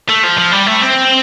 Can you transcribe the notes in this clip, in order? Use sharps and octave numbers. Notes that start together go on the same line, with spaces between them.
A3
F3
F3
G3
A3
C4